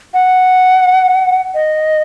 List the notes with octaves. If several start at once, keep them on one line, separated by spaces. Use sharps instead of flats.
F#5
D#5